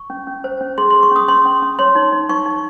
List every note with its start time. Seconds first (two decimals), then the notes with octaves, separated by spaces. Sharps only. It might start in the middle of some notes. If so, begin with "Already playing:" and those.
Already playing: C#6
0.10 C#4
0.27 C#4
0.44 C5
0.61 C#4
0.78 G#4 C6
0.90 G#4 C6
1.03 C#6
1.11 C#4 D#6
1.28 C#4 C6
1.46 C#4
1.62 C#4
1.79 C#5 C6
1.95 D#4
2.12 D#4
2.29 D#4 C#6
2.46 D#4